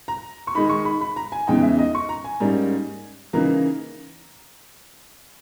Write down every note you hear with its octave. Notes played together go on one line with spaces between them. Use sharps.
A#5
C#6
D#3 G#3 D#4 B5
C#6
B5
B5
A#5
G#5
E2 C#3 E3 G#3 D#4 G5
E5
D#5
C#6
A#5
G#5
G#2 G3 A#3 C#4
C#3 E3 A#3 D#4 A#5